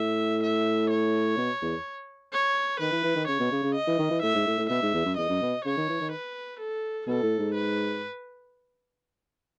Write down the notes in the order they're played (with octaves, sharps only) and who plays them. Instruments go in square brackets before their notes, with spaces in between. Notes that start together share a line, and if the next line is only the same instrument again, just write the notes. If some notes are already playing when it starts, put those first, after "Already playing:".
Already playing: [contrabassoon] A2 [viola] E5
[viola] E5
C#5
[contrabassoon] B2
E2
[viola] C#5
[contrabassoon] D#3 [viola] B4
[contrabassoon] E3
E3
D#3
[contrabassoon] C#3 [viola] C#5
[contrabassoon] B2
C#3
C#3
[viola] D#5
[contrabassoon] E3
D#3
E3
[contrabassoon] A2 [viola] E5
[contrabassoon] G#2
A2
A2
[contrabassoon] B2 [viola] E5
[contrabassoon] G#2
E2
F#2
[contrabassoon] E2 [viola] D#5
[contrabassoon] F#2
B2
[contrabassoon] C#3 [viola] C#5
[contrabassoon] D#3
E3
D#3
[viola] B4
A4
[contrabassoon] B2 [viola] A4
[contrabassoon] A2
G#2
[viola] B4